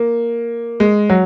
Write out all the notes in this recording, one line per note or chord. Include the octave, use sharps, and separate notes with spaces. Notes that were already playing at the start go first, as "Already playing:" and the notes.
Already playing: A#3
G#3
F#3